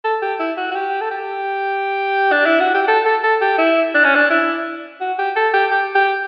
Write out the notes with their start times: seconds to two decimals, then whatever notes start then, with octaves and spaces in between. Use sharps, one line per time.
0.05 A4
0.22 G4
0.40 E4
0.57 F#4
0.71 F#4
0.76 G4
1.01 A4
1.11 G4
2.32 D4
2.46 E4
2.60 F#4
2.74 G4
2.88 A4
3.05 A4
3.23 A4
3.41 G4
3.58 E4
3.94 D4
4.05 C#4
4.16 D4
4.30 E4
5.01 F#4
5.19 G4
5.36 A4
5.54 G4
5.71 G4
5.95 G4